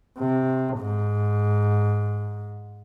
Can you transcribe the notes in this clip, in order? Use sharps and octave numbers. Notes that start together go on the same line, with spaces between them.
C3
G#2